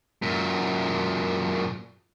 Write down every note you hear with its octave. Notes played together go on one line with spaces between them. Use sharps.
F#2 A#2